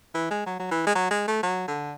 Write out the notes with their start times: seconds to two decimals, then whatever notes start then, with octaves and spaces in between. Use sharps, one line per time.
0.14 E3
0.30 G#3
0.46 F#3
0.59 F#3
0.71 E3
0.86 G#3
0.95 F#3
1.10 G#3
1.27 A3
1.43 F#3
1.68 D3